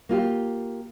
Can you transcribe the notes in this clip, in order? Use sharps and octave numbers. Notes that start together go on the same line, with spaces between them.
A#3 F4 G4